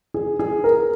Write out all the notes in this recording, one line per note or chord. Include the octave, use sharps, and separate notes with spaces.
G#4
G#4
A#4